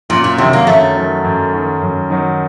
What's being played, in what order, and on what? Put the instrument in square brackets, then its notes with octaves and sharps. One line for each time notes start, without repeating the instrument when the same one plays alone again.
[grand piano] F#2 [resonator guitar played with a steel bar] A#2
[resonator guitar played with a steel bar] A#2
[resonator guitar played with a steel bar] C3 [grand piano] D#3 F#3
[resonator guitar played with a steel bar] A#3
[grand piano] F#2 [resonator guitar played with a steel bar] A3
[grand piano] D#3 F#3
F#2
D#3 F#3
F#2
D#3 F#3